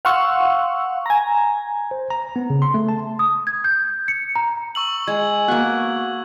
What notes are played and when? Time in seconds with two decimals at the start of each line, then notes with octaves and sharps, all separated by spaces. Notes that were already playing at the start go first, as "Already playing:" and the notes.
0.05 F5 F#5 C6 C#6 E6
1.06 G#5 A#5
1.91 C5
2.10 A#5
2.36 B3
2.50 C#3
2.62 C6
2.74 A3
2.89 A5
3.19 D#6
3.47 G#6
3.64 G6
4.08 C#7
4.36 A#5
4.75 C#6 E6 F#7
5.07 G#3 G#6
5.48 A#3 B3 F#4 C#6 F#6